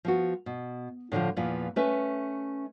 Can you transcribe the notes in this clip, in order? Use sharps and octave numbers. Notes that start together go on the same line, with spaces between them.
F3 B3 F#4
B2
A2 D3 E3 F3
E2 A#2 E3 F3
A3 C#4 B4 E5